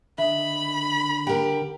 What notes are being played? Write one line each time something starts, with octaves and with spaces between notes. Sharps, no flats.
D3 D#5 E5 B5
G4 A#4 F#5